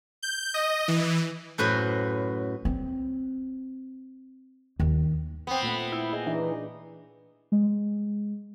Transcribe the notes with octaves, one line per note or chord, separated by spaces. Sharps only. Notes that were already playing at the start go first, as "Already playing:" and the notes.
G6
D#5
E3
F#2 A2 F#4 B4 C5
C4
D#2
B3 C4
A#2 A3 F#5 B5
E4
G#4 D#5
E3 D4 D#4
G#3